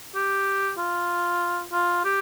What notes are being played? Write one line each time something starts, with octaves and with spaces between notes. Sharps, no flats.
G4
F4
F4
G4